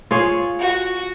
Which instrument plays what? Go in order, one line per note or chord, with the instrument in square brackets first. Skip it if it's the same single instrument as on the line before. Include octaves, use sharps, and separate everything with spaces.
[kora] F4 G#4 C#5
[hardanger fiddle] F#4